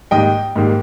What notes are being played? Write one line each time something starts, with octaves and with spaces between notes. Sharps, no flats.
G#2 D#3 G3 A#3 D#5 G5
G#2 D#3 G3 A#3